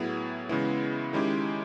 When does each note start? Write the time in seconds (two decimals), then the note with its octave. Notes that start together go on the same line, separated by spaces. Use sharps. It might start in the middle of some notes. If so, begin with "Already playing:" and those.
Already playing: A2 F#3 B3 E4 G#4
0.49 C#3 E3 G#3 B3 E4
1.13 D#3 G#3 C#4 E4 G4